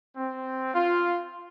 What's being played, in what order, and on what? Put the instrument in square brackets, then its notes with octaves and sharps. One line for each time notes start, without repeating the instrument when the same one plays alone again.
[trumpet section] C4
F4